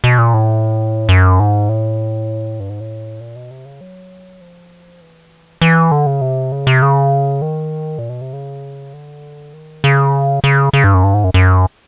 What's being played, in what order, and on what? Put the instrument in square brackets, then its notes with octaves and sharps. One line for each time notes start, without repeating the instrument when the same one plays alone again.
[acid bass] B2
A#2
A2
F#2
G#2
A2
G2
G#2
A2
A#2
B2
C3
C#3
F#3
F3
E3
E3
D3
C#3
C3
C#3
C3
C#3
D#3
A#2
B2
C3
C#3
D3
D#3
C#3
C#3
C#3
G2
F#2
G2
G#2
F#2
F#2